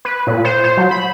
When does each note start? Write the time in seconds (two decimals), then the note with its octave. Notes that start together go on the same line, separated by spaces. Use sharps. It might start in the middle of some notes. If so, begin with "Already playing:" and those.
0.05 B4
0.27 A#2
0.45 C5
0.64 C5
0.77 F#3
0.91 B5